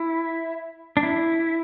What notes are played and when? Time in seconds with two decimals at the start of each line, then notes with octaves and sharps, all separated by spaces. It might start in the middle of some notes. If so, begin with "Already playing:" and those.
Already playing: E4
0.97 D4
1.03 E4